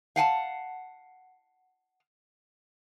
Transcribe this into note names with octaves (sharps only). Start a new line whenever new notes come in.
F5 F#5 G#5 A5